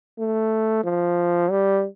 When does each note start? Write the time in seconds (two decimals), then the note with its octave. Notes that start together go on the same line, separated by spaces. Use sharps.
0.19 A3
0.84 F3
1.51 G3